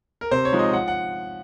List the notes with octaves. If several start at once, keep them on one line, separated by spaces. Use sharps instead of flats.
A#4
C3 C5
C#5
F3 G#3 D#4
D#5
F3 F#5
F#5